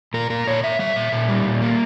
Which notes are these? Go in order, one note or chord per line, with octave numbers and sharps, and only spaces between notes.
A#2 A#4
A#2 A#4
A#2 C#5
A#2 E5
G3 E5
A#2
A#2
G3
A#2
A#3